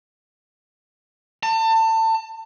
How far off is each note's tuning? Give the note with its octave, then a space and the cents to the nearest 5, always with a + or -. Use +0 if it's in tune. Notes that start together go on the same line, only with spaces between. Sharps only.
A5 +30